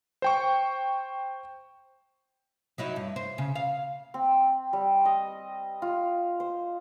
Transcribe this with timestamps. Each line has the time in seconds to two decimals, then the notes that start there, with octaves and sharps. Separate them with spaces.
0.22 C5 G5 C#6
2.78 F#3 D#4 E4
2.96 G2
3.16 C5
3.38 C#3
3.55 F5
4.14 C4
4.73 G3
5.05 D#5
5.82 F4
6.40 C5